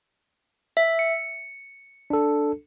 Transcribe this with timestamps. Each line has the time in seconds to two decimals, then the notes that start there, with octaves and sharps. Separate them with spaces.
0.77 E5
0.99 C#7
2.10 D4 A4